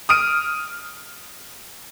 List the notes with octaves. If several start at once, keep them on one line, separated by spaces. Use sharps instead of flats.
D#6 F6 D7 D#7